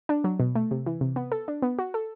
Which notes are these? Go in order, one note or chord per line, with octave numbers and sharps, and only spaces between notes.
D4
F#3
B2
A3
C3
E3
C3
B3
A4
D4
B3
F#4
A4